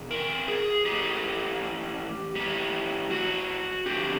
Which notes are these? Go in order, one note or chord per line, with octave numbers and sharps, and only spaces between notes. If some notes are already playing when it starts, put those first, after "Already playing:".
Already playing: E2 B2
A#4
G#4
A2 E3 G4
A2 E3 G4
F#4
F2 D3 G4